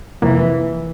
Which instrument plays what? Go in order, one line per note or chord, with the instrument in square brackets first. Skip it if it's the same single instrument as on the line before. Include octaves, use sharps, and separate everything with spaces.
[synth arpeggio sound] F2 C3 F3 A#3 [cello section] E3